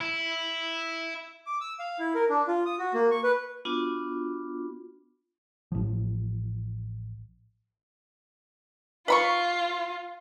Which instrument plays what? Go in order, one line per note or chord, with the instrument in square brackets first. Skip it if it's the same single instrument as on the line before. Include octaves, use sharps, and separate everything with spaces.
[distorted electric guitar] E4
[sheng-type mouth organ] D6
E6
F5
E4
A#4
D4
F4
D#6
F#4
A#3
C#6
B4
[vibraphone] B3 D4 F4 F#4
[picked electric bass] A1 F3
[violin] F4 [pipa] B4 B5 C#6